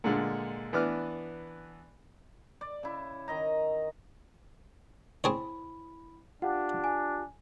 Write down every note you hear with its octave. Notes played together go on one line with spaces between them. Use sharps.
A#2 D3 G#3
E3 B3 D4 D6 F6
D5
C#3 E4
D#3 D#5 A#5
C4 E4 G#4 C#5 B5
D4 F4 G4 F#5
G#5